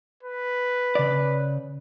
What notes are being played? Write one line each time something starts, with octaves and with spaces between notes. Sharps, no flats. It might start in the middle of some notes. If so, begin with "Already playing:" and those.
B4
C#3 D5